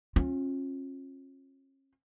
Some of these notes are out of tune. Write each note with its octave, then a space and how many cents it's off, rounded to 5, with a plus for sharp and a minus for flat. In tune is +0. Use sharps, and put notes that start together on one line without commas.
C#4 -40 F4 +20